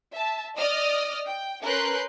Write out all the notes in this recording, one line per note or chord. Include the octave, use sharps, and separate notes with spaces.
E5 A5
D5 D#5 D#6 F6
G5
C#4 A#4 B4 C6 F#6 G6